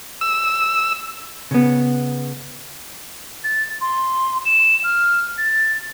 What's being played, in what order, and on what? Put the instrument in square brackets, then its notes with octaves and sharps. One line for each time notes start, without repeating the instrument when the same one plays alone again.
[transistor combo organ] E6
[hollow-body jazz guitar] C#3 B3
[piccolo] A6
C6
E7
F6
A6